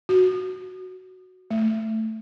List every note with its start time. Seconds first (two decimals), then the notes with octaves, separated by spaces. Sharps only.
0.09 F#4
1.51 A3